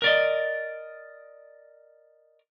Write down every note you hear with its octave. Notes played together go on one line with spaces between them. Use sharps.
A#4 D5 D#5